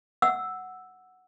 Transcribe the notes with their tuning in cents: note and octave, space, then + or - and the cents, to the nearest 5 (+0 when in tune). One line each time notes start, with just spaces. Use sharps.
F#5 +0 E6 +0